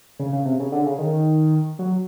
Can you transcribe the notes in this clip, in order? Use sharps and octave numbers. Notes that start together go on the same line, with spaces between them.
C#3
C#3
C3
C#3
D3
C#3
D#3
F#3